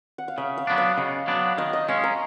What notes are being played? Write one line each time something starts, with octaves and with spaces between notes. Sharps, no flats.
F#5
F5
C#3 E5
F5
F#3 B3 D4
F5
C#3 D#5
F#3 B3 D4
D#3 D#5
D#5
G#3 C#4 F5
A#5